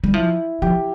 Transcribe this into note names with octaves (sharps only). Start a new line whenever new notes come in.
G3
F3 E4
F3 G4